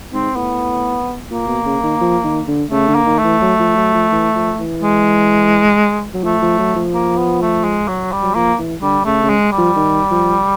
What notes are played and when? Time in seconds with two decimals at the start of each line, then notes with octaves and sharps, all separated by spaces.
0.13 G#2 C4
0.36 A2 B3
1.30 A#2 A#3
1.47 B2
1.66 C#3
1.83 D#3
2.01 F3
2.24 D#3
2.48 D3
2.71 C#3 A3
2.88 D3
2.95 A#3
3.06 D#3
3.19 A3
3.24 E3
3.42 F#3
3.60 F3
3.77 F#3
3.94 F3
4.12 E3
4.35 F3
4.59 E3
4.82 G#3
6.14 F#3
6.23 F3 A3
6.42 F3
6.59 F#3
6.76 F3
6.94 A#3
7.17 B3
7.42 A3
7.64 G#3
7.88 F#3
8.12 G3
8.23 F#3
8.35 F3 A#3
8.59 E3
8.82 D3 G3
9.05 C#3 A3
9.23 C#3
9.30 G#3
9.52 G3
9.58 F3
9.76 D#3
10.11 F3